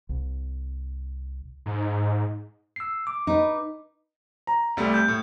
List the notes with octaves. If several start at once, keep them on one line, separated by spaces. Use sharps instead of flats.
C2
G#2
E6 C7
D6
D#4 B4
A#5
C2 G3 A3
G6
A2